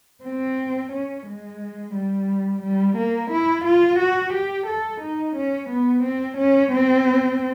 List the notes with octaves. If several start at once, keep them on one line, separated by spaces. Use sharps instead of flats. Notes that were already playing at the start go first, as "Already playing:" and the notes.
C4
C#4
G#3
G3
G3
A#3
E4
F4
F#4
G4
A4
D#4
C#4
B3
C4
C#4
C4